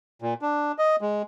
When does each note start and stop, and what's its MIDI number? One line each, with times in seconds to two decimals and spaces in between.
0.22 0.34 46
0.42 0.72 62
0.78 0.96 75
1.01 1.22 56